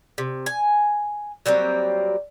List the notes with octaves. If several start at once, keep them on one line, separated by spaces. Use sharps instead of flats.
C3
G#5
F#3 G3 A#3 C4